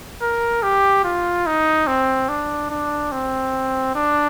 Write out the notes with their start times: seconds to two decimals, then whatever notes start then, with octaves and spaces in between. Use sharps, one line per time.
0.22 A#4
0.63 G4
1.04 F4
1.46 D#4
1.87 C4
2.29 D4
2.70 D4
3.12 C4
3.95 D4